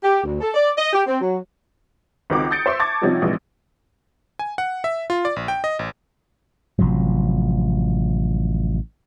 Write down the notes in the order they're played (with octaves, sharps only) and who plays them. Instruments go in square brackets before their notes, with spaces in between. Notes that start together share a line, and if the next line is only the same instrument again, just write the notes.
[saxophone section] G4
D2
A4
D5
D#5
G4
C4
F#3
[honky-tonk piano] C#2 D#3 C4 F#4 D6
D#6 G6 A6 C#7 D7
C5 E5 C6 C#6
A5 C#6 D6 G#6 A6
C3 F3 G3 C#4 D#4 F#4
A#1 C3 E3 G#3
[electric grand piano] G#5
F#5
E5
F4
D5
A#1
G5
D#5
A1
[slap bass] A1 C3 F3 F#3